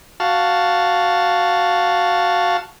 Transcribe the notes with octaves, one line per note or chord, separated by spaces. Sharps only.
F#4 F5 A5